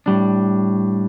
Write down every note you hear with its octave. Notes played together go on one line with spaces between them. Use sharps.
A2 G3 D4